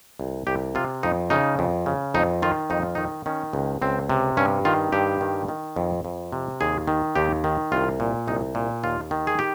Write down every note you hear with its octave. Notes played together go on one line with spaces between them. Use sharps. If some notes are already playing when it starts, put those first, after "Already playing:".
C2
C2 G4
C3 F4
F2 D#4
C#3 D#4
F2
C#3
F2 D#4
D#3 F4
F2 D#4
F4
D#3 D#4
D#3 C#4
C#2
C#2 C4
C3
G2 C#4
D#3 F4
G2 G4
D#3
D#3
F2
F2
C3
D#2 G#4
D#3
D#2 G4
D#3
C2 F4
A#2
C2 D#4
A#2
D#2 F4
D#3
G#4
G4